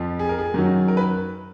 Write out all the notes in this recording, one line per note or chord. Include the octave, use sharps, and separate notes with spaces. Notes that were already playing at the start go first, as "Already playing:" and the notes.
Already playing: F2 F3
G#4
A#4
G#4
F#2 D#3 F#3
A#4
B4